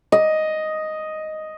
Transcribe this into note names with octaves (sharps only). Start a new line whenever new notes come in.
D#5